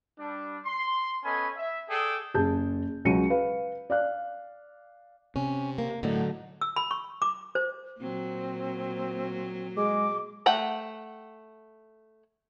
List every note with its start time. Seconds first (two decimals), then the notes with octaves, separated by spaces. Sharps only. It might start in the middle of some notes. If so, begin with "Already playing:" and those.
0.19 G3 D4
0.65 C6
1.24 B3 C#4 A4 D#5 G#5 B5
1.56 E5
1.88 G#4 A4 D5 G5 D#6
2.34 F#1 G#4 A5 G6
3.05 C#2 F#3 C#7 D#7
3.30 B4 F5
3.90 D5 F5 F#6
5.36 C3 C#4
5.78 A#3
6.03 A2 D3 F#3 D#4
6.61 E6
6.76 B5
6.91 C#6
7.22 D6
7.55 C5
8.00 A#2 F#3 C4
9.77 G#3 D6
10.46 A3 F#5 G5